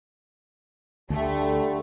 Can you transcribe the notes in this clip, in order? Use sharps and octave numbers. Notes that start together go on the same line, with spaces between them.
D2 D3 G3 A3